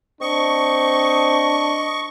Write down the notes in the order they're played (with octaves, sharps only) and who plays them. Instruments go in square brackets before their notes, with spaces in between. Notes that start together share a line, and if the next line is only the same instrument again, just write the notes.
[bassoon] C4 [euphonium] D4 [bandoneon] D#5 [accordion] C#6